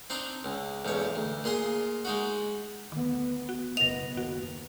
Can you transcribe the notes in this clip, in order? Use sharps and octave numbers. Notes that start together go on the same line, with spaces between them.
C4 D4 D#4 A#5
C#2
B1 E2 G#2 C#5
D2
A#2 G#4 C6 D#6
G#3 D#4 F#4
D2 D#3 B3
F#4
F#1 B2 B3 D#5 A#6 F7
D#2 F#4